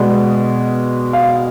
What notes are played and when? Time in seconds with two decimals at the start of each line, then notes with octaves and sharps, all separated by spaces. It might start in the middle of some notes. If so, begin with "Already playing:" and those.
Already playing: B2 G#3 B3 D5
1.13 F5